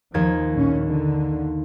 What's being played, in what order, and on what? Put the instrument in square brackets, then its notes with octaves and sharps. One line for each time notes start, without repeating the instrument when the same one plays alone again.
[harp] D#2 G#6 [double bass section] F3
[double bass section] A#1 C#4
D3